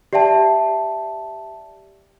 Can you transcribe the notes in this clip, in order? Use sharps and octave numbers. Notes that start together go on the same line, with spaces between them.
G4 D5 E5 G5 A5